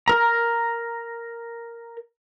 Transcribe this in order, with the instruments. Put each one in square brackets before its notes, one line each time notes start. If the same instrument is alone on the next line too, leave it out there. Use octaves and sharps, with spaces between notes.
[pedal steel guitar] A#4 A#5